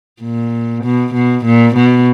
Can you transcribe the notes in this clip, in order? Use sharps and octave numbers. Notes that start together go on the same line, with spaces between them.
A#2
B2
B2
A#2
B2